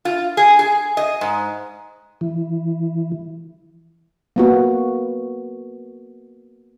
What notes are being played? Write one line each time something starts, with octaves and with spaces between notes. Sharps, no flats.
F4
G#4
G#4
D#5
G#2
E3
A#3 B3 F#4